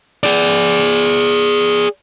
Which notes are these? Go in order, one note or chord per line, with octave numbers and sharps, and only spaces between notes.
G#4 D5